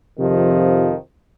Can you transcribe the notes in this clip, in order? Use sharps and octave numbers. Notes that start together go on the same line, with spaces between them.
F2 C3 D#3 F3